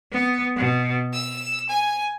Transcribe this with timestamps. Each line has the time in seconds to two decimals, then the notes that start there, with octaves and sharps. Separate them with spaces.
0.12 B3
0.56 B2
1.12 E6
1.69 G#5